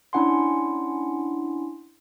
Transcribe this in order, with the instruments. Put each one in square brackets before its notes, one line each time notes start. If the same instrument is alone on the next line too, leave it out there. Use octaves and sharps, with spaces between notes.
[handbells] C#4 D4 E4 F#5 G#5 C6